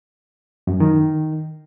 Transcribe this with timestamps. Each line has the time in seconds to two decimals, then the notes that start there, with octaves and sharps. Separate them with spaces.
0.67 F#2
0.80 D#3